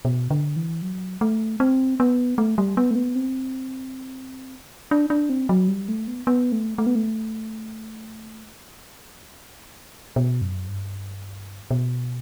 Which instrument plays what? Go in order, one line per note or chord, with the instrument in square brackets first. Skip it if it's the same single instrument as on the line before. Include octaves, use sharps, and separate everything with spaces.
[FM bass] B2
D3
E3
F#3
A3
C4
B3
A3
G3
B3
A3
B3
C4
D4
D4
C4
F#3
G3
A3
B3
B3
A3
A3
B3
A3
B2
F#2
G2
B2